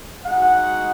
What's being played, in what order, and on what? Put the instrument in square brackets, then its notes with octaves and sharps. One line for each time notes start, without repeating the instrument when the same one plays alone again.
[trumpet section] G#3 D#4 F#4 F#5